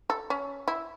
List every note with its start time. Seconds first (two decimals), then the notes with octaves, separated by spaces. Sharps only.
0.10 A4
0.30 C#4
0.68 E4